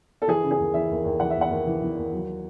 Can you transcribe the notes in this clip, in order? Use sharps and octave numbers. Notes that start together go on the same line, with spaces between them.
A4
E3 G#4
C#3
G#4
D#2
E3 E5
D#2
D#2
E3 F#5
E5
D#2
F#5
D#2
E3
E3
D#2
F#3